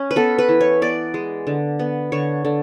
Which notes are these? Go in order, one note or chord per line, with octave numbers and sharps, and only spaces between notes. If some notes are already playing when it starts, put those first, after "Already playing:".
Already playing: C#4
B4
B3 A4
B4
E3
C#5
B3 D5
G#3
D3
B3
D3 C#5
D3